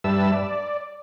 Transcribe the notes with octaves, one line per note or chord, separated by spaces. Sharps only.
G2 G3 B4 E5 A5 E6
D5